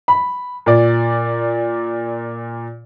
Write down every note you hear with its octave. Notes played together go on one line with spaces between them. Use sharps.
B5
A#2 D5